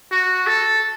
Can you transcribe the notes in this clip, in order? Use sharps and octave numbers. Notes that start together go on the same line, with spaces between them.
F#4
A4